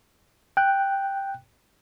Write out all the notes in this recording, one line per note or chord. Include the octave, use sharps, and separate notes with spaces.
G5 F#6